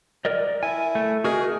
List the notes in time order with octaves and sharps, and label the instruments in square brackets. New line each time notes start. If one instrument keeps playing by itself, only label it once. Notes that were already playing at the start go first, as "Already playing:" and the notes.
[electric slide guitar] A#4 D5 D#5
[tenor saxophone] E4 [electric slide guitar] G#5
[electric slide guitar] A3
[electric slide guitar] F#4 A#4 D#5 [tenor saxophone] G#4